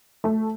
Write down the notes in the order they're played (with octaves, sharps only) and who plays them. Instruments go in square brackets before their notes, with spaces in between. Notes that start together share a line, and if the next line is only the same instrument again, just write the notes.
[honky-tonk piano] A3